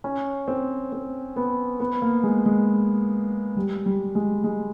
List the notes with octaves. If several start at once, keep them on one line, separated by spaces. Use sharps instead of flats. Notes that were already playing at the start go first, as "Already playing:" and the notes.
C#4
C4
C4
B3
B3
A#3
G#3
G#3
G3
G3
G#3
G#3